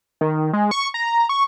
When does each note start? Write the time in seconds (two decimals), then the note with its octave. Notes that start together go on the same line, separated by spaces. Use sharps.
0.21 D#3
0.53 G#3
0.71 C#6
0.94 A#5
1.29 C#6